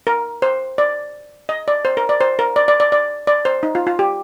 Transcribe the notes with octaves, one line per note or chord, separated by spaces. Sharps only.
A#4
C5
D5
D#5
D5
C5
A#4
D5
C5
A#4
D5
D5
D5
D5
D5
C5
D#4
F4
F4
G4